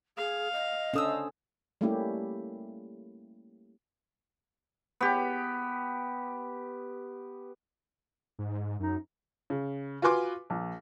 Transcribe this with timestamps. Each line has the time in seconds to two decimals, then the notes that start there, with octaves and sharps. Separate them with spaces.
0.17 G#4 F5
0.53 D#5
0.93 C#4 D4 A4 C5 D#6 E6
1.81 G3 A3 A#3 C#4 E4 G4
5.01 B3 G4
8.39 G#2
8.80 F#2 D#4
9.50 C#3
10.02 F4 F#4 B4 G#5 C6 D6
10.50 A#1